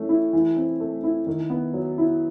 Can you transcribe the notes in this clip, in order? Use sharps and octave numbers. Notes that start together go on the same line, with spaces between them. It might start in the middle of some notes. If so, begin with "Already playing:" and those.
Already playing: E3 A3 C#4
E4
E3
C4
A3
E4
D#3
B3
F#3
E4